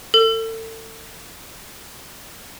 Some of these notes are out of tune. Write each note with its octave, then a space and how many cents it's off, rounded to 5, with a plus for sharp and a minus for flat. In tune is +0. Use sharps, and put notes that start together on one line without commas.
A4 +35